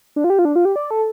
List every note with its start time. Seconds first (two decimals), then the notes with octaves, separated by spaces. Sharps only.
0.16 D4
0.24 F4
0.30 G4
0.39 F4
0.45 D4
0.56 F4
0.65 G4
0.76 D5
0.91 A4